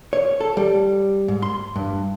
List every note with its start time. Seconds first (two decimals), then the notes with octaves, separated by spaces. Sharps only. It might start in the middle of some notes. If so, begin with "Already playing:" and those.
0.13 C#5
0.40 A4
0.57 G3
1.28 G#2
1.42 C6
1.76 G2